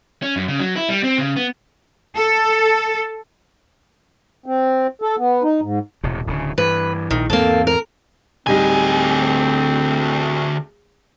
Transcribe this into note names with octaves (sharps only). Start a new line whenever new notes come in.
C#4
F#2
C#3
F#3
E4
G3
C4
C#3
B3
A4
C4
A4
B3
D#4
G#2
E1 A2 C3
D1 C#3
G2 E3 B4
A#1 A#2 D#3
E2 G#2 A#3 C4 A4
A#4
D1 D2 G3 C4 D#4 G#5